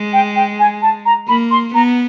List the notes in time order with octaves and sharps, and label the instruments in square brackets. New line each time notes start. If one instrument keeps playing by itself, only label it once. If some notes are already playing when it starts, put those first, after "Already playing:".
Already playing: [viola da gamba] G#3
[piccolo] G5
G5
G#5
A5
A#5
[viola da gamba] A#3 [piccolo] B5
[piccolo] C6
[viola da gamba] B3 [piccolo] A#5